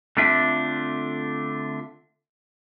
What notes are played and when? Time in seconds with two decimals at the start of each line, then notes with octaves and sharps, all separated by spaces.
0.17 D3 A3 C4 D4 F4 E5